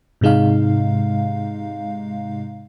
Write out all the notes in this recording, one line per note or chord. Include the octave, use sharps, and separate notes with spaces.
G#2 C3 G#3 D#4 F5